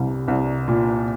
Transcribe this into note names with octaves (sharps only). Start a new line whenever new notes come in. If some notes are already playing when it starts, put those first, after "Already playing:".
Already playing: C2 G3
C2
A#2